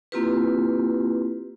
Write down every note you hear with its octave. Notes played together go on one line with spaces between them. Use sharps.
A#3 C4 E4 F4 G4 B4